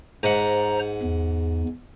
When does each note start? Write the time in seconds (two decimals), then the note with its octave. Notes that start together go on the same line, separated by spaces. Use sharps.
0.23 G#2 C5 F#5 A#5
1.03 E2